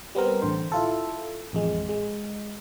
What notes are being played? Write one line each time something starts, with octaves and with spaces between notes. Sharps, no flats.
G3 B3 C4 A#4
A1 D3 C5
E4 F4 A4
A1 F2 G#3
G#3